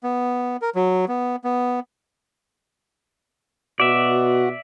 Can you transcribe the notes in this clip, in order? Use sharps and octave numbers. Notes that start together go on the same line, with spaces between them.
B3
A#4
F#3
B3
B3
B2 F#4 D5 E5